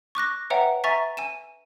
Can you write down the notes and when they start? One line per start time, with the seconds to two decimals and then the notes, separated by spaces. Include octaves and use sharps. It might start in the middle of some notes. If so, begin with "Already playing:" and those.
0.15 C#6 D6 F#6 A#6
0.50 B4 C#5 E5 F#5 G5 A#5
0.84 E5 G#5 A#5 C#6 A6 B6
1.17 G#5 D#7 E7